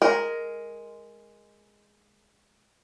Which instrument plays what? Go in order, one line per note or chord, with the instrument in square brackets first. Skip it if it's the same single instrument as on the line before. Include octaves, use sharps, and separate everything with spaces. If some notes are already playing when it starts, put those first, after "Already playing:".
[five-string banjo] G#3 A#4